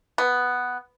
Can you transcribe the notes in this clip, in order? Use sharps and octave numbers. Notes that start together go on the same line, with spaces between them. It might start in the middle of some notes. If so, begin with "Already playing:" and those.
B3